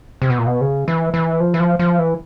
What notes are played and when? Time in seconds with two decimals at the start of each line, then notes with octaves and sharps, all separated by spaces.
0.22 C3
0.30 B2
0.38 A#2
0.46 B2
0.61 C#3
0.88 E3
1.14 E3
1.40 F3
1.54 E3
1.60 F3
1.79 F3
1.99 E3